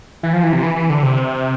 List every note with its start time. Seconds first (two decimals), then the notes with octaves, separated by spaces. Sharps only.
0.23 E3
0.33 F3
0.43 E3
0.53 C3
0.63 E3
0.76 E3
0.90 D3
1.03 C3